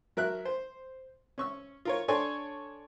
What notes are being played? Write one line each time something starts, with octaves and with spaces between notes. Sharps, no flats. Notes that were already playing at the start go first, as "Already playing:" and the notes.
F#3 A#4 E5 F#6
C5
C#4 C#6 E6
F4 A#4 C#5
D4 A4 C#5 G#5 C6 C#6